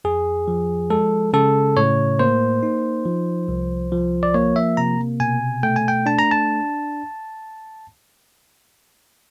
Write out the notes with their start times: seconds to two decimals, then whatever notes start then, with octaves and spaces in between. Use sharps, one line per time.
0.04 F2 G#4
0.48 F3
0.90 G#3 A4
1.33 C#3 A4
1.77 A2 C#5
2.19 A#3 C5
2.63 D#4
3.05 F3
3.49 C2
3.92 F3
4.23 D5
4.34 A#3 C#5
4.56 E5
4.77 C3 A#5
5.20 B2 G#5
5.63 A3 G5
5.76 G#5
5.88 G5
6.06 D4 A5
6.19 A#5
6.31 A5